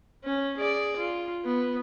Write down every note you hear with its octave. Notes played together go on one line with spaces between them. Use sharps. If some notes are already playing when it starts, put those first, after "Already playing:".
C#4
G#4 D5
F4
B3